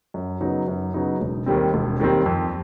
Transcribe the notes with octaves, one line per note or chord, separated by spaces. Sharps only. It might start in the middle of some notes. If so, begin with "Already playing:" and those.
F#2
C#3 F#3 B3 D#4
F#2
C#3 F#3 B3 D#4
E1
D#2 D#3 G3 C4
E1
D#2 D#3 G3 C4
F2